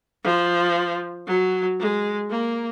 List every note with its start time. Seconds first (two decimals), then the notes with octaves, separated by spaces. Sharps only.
0.24 F3
1.27 F#3
1.79 G#3
2.31 A#3